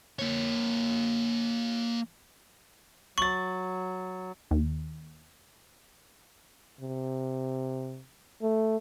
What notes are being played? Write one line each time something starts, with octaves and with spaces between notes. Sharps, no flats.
A#3 C#5
F#3 C#6 A6 F#7
D#2
C3
A3